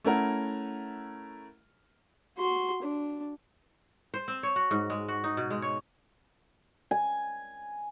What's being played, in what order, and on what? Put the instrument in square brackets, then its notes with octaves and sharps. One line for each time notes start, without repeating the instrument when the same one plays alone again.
[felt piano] A3 C#4 E4 A#4 F#5
[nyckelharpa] F#4 C6
D4
[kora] C5
C4
C#5
F#4
G#2
G#3
F#4
D#4
B2
G#3
C#5
[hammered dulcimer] G#5